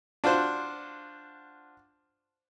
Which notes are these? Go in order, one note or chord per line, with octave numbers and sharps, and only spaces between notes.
D4 F4 F#4 C5